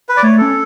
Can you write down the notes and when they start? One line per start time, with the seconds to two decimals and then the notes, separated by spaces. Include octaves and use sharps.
0.09 B4
0.17 D5
0.23 A3 C#5
0.38 C#4 A4